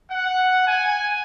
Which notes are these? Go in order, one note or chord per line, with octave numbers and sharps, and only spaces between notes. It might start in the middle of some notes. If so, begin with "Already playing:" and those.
F#5
G#5